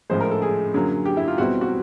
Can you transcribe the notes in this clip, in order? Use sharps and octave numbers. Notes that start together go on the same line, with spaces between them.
A2 F3 G#3 C5
A#4
A4
G#4
F#2 D3 F#3 A#3
G4
E4
F4
E2 B2 G3 C4 E4 F#4
F#4